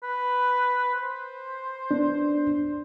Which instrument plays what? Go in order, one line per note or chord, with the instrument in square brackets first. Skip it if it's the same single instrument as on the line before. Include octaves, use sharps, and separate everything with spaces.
[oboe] B4
C5
[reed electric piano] B3 D4